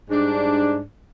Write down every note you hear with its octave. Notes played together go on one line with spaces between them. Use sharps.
G#2 G3 D4